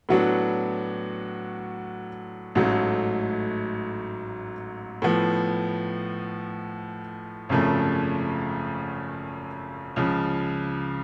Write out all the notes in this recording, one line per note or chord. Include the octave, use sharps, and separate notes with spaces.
A2 F#3 B3 D4 F#4
A1 G#2 F#3 A3
A2 F3 B3
G#1 F#2 C#3 F3 A3
C#2 C#3 F3